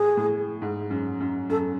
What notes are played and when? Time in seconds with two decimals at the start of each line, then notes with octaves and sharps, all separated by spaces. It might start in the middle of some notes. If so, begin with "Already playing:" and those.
Already playing: A2 G#4
0.17 A2
0.62 G#2
0.90 F#2
1.20 F#2
1.49 F#2 A4